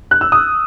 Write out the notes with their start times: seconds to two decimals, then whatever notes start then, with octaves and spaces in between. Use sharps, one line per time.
0.11 F#6
0.21 E6
0.32 D#6